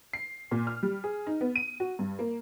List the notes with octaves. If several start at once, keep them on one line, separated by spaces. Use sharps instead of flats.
C7
A#2
F6
G3
G#4
D#4
B3
D#7
F#4
G2
A#3